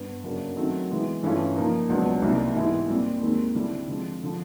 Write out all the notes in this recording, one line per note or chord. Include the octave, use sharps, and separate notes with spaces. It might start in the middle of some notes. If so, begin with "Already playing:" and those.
Already playing: G2 B3
F#2 C#3 F#3 A#3 D4
D#3 F#3 A3 C4
E3 G#3 B3
G2 E3 A3 C#4 F4
A#2 F3 A#3 D#4
C#2 B2 F#3 B3 D4
C2 A#2 G3 C4 D#4
G#2 E3 G#3 B3 E4
A#2 G3 C4
D#2 D#3 G#3 C4
D3 G3 C4 E4
D3 F3 G#3 C4
D3 F3